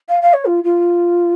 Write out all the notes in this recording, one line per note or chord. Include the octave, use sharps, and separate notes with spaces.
F5
F5
C#5
F4
F4